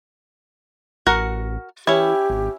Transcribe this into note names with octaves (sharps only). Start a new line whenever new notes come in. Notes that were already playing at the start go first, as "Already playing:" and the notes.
A1 F#4 A#4 F#5
E3 C#4 E4 G4
G#1